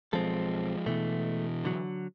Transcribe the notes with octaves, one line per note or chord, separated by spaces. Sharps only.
B1 F3 G#3 C4 A4
B2 E3 A3
D3 F#3